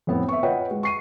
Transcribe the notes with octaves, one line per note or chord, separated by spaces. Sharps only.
F2 A2 B3 C4
E5 C#6
F4 B4 C#5 D#5 F#5 G5
G#3
C#6 C7 D#7